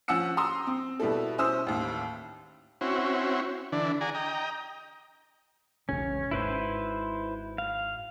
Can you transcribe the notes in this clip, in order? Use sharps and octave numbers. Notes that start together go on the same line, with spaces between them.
F3 C#4 F#5 E6 C#7
A#5 C6 D#6 E6
C4
B2 G3 E4 A4
C#4 E4 C5 D#6 E6
A1 D#2
C4 C#4 E4 F#4
D3 E3 D4
G#4 D5 F#5 G#5 A#5
D#5 G5 A#5
E1 B1 C#3 C#4
G#1 G#2 E4 B4 C5
F5